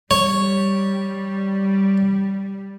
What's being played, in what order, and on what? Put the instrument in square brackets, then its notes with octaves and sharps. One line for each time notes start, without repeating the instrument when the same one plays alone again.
[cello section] G3 [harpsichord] C#5